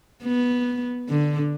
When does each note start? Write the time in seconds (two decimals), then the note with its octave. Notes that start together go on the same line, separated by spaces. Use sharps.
0.24 B3
1.09 D3